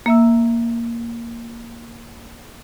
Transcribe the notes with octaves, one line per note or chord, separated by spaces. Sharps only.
A#3 E5 E6